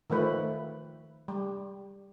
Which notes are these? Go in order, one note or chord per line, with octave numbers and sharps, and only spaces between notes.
D#3 F3 A3 B4
G3